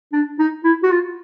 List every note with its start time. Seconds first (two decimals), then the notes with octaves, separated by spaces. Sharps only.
0.12 D4
0.39 D#4
0.64 E4
0.83 F#4
0.91 F4